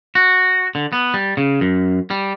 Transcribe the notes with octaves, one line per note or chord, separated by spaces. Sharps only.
F#4
D3
B3
G3
C#3
F#2
G3